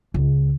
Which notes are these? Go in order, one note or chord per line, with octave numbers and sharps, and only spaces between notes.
C#2